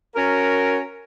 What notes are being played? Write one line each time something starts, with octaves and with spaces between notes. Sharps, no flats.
C#4 F#4 A#4